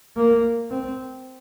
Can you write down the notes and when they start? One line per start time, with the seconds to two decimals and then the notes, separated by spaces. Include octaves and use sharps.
0.16 A#3
0.71 C4